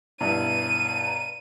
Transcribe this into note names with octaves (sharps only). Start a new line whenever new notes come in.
G2 B2 E4 A#5 D#7